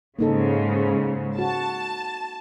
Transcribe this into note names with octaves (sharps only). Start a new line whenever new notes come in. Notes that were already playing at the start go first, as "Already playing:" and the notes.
G#2 C#3 A#3 D#4 A4
F#4 A5